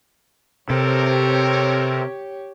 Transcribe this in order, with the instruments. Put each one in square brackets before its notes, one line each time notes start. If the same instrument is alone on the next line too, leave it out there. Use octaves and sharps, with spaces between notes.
[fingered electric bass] C3 [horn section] C4 A4 A#4 [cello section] G4 C#5